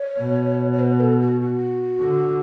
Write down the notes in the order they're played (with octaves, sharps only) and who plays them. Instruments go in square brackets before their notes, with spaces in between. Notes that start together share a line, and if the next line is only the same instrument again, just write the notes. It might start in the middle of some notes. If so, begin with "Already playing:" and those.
Already playing: [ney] C#5
[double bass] B2
[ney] C#5
B4
A4
F#4
F#4
[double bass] D3